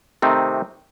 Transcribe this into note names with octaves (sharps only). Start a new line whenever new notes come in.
C3 D#3 A3 C4 D#4